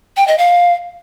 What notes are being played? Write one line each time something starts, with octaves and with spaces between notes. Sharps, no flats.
G5
D#5
F5